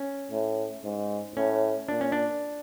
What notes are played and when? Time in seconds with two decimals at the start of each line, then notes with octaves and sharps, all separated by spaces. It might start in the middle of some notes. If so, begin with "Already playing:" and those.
Already playing: C#4
0.31 A2
0.84 G#2
1.36 A2 C#4
1.88 A#2 D4
2.01 C#4
2.12 D4